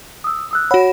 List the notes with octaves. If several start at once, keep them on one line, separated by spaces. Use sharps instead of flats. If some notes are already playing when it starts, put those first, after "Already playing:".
D#6 E6
D#6 E6 F#6
F#4 C#5 F#5 B5